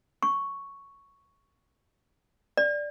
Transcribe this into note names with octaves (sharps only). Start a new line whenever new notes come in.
C#6
D5